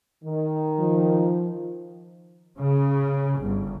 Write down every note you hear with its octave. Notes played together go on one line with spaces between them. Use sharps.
D#3
F3
C#3
G1